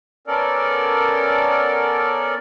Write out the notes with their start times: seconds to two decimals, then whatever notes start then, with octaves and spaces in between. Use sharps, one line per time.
0.27 B3 C#4 A4 A#4 D5